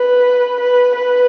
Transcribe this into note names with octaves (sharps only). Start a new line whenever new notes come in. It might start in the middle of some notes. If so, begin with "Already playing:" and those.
Already playing: B4
B4
B4